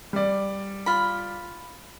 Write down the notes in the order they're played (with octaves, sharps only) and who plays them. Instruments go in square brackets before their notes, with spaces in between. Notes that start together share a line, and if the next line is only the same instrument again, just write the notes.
[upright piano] G3 D5
[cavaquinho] F4 B5